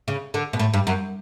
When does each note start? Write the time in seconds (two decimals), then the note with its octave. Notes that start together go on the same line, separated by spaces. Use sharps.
0.08 C#3
0.34 D3
0.53 B2
0.59 A2
0.74 G2
0.87 F#2